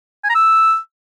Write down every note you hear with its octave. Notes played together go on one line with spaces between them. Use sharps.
G#5
A#5
E6